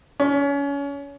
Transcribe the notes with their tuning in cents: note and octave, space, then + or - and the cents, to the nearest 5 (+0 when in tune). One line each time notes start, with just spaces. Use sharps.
C#4 +30